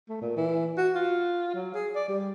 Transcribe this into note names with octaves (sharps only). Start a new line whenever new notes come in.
A3
A#2
E3
F#4
F4
F#3
G#4
D5
G3